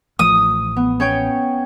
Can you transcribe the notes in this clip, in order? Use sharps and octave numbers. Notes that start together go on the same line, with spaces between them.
A1 F3 A3 D#6
B3
C#4 C#5 G5